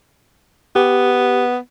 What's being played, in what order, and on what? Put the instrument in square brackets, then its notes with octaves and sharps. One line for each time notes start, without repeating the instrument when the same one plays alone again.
[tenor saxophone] B3 [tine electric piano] G4